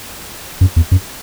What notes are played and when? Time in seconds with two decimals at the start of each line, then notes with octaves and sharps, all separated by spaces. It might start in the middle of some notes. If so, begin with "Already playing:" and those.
0.61 F#2
0.76 E2
0.92 F#2